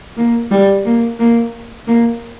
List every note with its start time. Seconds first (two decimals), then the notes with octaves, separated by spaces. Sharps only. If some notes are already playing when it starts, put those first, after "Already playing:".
0.17 A#3
0.51 G3
0.85 A#3
1.19 A#3
1.87 A#3